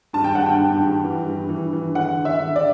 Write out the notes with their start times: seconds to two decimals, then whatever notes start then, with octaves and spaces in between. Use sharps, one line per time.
0.13 G2 A5
0.24 G5
0.35 G2 F#5
0.46 G5
0.60 G2
0.82 G2
1.04 E3
1.27 G2
1.49 E3
1.73 E3
1.95 D3 F#5
2.17 D3
2.25 E5
2.40 D3
2.56 D5